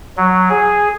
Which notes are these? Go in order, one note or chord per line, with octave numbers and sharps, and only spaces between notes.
F#3
G#4